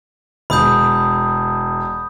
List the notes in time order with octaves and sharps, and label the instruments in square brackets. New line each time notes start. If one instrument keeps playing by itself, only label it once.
[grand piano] E1 [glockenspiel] B5 D#6 G6